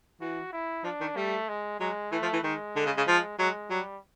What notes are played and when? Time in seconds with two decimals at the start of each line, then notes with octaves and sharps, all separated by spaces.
0.21 E3 F#4
0.53 E4
0.84 F3 D4
1.01 D#3
1.16 G3 A3
1.49 G#3
1.80 F#3 G#3
2.12 E3 A3
2.22 F3
2.33 E3
2.44 D#3 G#3
2.76 D3
2.86 C#3
2.97 C#3
3.08 F3
3.39 F#3 G#3
3.70 F#3 G3